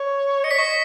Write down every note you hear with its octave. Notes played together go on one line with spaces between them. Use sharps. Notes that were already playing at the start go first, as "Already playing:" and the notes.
Already playing: C#5
D#5 C#7
C#5 B6
D#5 C#6 C#7